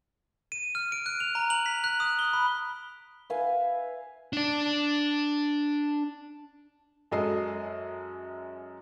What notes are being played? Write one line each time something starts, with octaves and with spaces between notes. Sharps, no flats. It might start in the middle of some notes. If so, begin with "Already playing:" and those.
D#7
F6
D7
F#6
F7
A#5
F#7
B6
F#6
D#6
G7
B5
B4 E5 F5 G#5
D4 D5
F#2 G#3 A4 D#5 C7